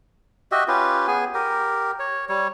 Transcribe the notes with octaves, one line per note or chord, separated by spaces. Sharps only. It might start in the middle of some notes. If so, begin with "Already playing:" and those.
F#4 G4 D#5 E5
C#4 F4 G4 B4
B3 G#4 G#5
G4 A#4
C#5
G3 C#5